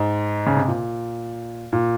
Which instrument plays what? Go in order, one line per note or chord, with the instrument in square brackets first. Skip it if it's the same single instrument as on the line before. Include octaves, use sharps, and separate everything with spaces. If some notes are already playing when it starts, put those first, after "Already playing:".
Already playing: [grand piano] G#2
C#3
C3
A#2
A#2